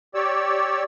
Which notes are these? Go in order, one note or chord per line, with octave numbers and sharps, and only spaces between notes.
G4 C#5 D5 E6